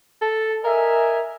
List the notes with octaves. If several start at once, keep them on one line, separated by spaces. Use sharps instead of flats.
A4
A#4 D#5 E5 G#5